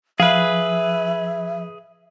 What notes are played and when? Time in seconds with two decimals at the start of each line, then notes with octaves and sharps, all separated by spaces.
0.20 F3 G#4 B4 E5 F5